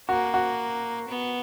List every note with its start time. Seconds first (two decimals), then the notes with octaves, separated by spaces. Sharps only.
0.09 A#3 F#4
0.34 F#4
1.08 B3